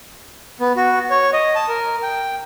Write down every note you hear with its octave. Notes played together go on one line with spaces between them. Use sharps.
B3
F#4
C#5
D#5
A5
A#4
G5